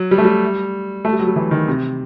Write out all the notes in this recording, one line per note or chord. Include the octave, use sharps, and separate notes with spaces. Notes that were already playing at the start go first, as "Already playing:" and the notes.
Already playing: F#3
G3
A3
G3
A3
G3
F#3
G3
E3
D#3
C3